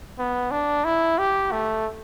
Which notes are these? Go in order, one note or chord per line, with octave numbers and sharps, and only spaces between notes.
B3
D4
E4
G4
A3